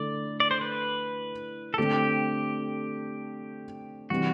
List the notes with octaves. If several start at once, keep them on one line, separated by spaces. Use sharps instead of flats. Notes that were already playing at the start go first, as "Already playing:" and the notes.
Already playing: D3 A3 E4 D5
D5
C5
B4
A4
D3 A3 C4 G4
C3 E3 G3 F#4